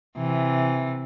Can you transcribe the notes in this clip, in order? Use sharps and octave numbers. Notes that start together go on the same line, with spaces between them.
C3 E3